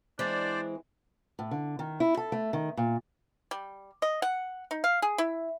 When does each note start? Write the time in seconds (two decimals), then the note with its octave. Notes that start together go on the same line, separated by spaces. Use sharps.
0.19 E3 G#3 C4 D4 C5 D5
1.39 A2
1.51 D3
1.79 D#3
2.00 E4
2.17 A4
2.32 A3
2.53 D#3
2.77 A#2
3.51 G3
4.02 D#5
4.22 F#5
4.71 D#4
4.84 F5
5.02 G#4
5.18 E4